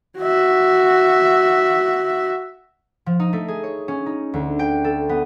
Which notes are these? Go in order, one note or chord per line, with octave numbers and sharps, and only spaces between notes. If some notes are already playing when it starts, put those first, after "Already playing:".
F#4 E5
F3
D#4
A3
G#4
C#5
C#4
D#4
D2
G5
A4
B3